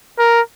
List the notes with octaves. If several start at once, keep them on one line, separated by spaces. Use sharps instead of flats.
A#4